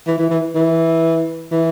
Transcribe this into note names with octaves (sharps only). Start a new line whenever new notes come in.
E3
E3
E3
E3
E3